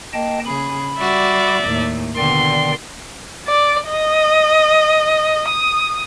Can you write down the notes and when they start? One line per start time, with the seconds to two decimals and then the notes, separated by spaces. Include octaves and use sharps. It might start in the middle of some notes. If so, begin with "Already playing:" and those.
0.13 A#3 D#5 G5 A5
0.45 C#3 G#4 B5
0.98 G3 F#4 D5 E5
1.63 D#2 A2
2.17 B2 D3 D#3 D5 G5 C6
3.48 D5
3.89 D#5
5.49 D#6